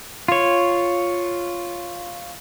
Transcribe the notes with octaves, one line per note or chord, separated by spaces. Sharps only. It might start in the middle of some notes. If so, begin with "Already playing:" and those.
F4 C#5